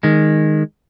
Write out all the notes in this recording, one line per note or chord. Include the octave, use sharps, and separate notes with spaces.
D#3 G#3